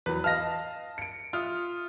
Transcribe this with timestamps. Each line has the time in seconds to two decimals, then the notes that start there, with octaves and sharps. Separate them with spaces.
0.06 E2 F#3 B4
0.24 D#5 F5 A5 F6 A#6
0.98 C#7 D7
1.33 F4 E5 D#6 F6